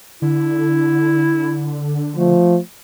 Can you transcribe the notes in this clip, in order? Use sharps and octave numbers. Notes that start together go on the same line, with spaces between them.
D3 E4
F3 A3